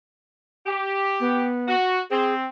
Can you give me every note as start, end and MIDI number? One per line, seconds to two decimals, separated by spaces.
0.66 1.43 67
1.20 1.74 59
1.67 1.99 66
2.10 2.45 60
2.10 2.34 68